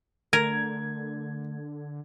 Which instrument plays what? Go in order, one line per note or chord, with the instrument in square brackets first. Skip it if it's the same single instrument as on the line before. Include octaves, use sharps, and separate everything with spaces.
[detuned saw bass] D3 [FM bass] A3 [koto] A#4 [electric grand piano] G#6